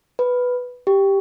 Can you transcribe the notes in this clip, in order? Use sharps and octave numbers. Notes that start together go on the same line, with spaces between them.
B4
G4